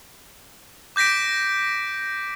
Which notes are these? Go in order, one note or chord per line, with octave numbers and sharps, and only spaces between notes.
D6 G6 A#6 B6 D7